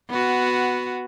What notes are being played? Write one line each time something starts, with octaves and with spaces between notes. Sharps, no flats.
B3 F#4